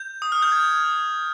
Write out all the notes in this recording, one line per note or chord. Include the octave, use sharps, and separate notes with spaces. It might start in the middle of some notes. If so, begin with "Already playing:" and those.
Already playing: G6
D#6
F6
G6
G#6